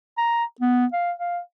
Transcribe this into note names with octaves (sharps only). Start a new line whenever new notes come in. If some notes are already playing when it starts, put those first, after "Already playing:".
A#5
B3
F5
F5